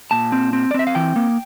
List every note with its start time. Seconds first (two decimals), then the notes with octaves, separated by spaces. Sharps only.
0.11 A#2 A5
0.32 C4
0.53 C4
0.71 D5
0.74 C4 E5
0.87 F5
0.95 E3 G5
1.16 A#3